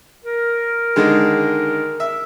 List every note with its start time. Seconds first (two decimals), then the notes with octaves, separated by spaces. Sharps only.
0.24 A#4
0.96 D3 D#3 G#3
2.00 E5